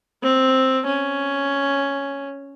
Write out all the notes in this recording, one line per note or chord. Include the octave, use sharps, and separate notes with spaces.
C4
C#4